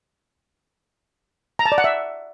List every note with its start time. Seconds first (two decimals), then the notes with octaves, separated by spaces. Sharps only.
1.59 A#5
1.66 A5
1.72 D5
1.78 F#5
1.84 E5